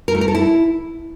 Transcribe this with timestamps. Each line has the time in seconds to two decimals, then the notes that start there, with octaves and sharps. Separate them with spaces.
0.08 A#4
0.15 A3
0.21 A#4
0.28 A4
0.35 E4